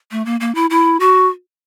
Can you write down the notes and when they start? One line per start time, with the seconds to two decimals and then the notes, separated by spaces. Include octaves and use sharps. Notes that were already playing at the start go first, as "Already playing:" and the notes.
0.11 A3
0.25 A#3
0.40 A#3
0.55 E4
0.70 E4
1.00 F#4